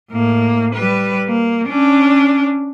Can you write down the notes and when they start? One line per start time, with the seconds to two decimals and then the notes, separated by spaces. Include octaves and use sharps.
0.10 A2 A#3
0.75 G3 B4
1.27 A#3
1.68 C#4 D4